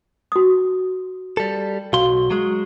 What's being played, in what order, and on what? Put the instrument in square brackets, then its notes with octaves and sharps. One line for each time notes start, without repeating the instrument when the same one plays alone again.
[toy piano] F#4 D#6
[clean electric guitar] G3 A4
[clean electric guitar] B1 C6 [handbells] F#4 [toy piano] F5
[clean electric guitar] F#3 G#3